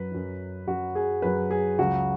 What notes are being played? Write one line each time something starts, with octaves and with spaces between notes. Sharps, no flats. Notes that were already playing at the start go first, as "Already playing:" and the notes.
Already playing: F#2 F#3 B4
F#2 F#3
F#2 F#3 F#4
G#4
F#2 F#3 B4
G#4
C#2 C#3 F#3 F#4